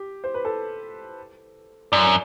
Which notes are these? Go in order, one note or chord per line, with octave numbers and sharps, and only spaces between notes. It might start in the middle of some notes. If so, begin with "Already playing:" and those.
Already playing: G4
C5
B4
A4
F#2 D5